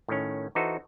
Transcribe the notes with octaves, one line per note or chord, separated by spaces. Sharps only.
A2 D#3 C#4
E3 D#4 F#4 A4 C5